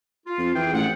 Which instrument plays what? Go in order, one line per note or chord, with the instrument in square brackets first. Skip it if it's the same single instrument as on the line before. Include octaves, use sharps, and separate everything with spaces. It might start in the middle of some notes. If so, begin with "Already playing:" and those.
[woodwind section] F4
[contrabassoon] F2
[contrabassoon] E3 [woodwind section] G#4 G5
[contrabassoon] A1 [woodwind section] F#5